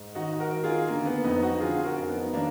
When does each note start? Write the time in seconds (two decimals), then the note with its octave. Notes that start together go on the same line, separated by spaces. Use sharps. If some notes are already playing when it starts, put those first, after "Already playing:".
Already playing: G#2
0.15 D#3 D#4 F#4
0.39 F#4 A#4
0.52 D#3
0.64 F4 G#4
0.88 D3 A#3
1.06 B3
1.24 F2 B3 D#4
1.43 D#4 F#4
1.60 D3 F4 G#4
1.84 F#4 A#4
1.97 F2
2.09 B3 D#4
2.33 D#3 A#3 D4